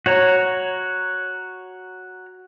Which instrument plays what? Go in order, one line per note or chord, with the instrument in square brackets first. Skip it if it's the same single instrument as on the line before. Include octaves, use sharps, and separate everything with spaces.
[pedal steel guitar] F#4 C#5 A#5